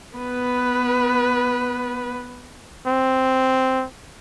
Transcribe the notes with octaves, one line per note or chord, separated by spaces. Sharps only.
B3 B4
C4